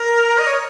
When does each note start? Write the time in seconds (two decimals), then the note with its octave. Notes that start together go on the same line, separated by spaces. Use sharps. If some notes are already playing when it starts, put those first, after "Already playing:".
Already playing: A#4
0.38 D#5
0.47 C#5